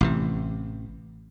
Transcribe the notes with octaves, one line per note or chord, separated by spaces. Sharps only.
A1 C3 E3